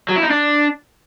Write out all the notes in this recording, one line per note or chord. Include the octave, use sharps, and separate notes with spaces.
F#3
E4
D#4
D4